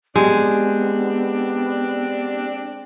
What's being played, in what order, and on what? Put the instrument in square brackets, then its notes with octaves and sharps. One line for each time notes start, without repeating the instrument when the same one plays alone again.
[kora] G#3 [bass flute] B3 [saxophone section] C4 D4 [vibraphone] G4